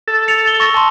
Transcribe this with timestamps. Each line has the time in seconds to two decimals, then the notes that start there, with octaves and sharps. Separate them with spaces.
0.08 A4
0.28 C#7 F7
0.48 G7
0.60 C#6 E6 A#6
0.74 A5 C6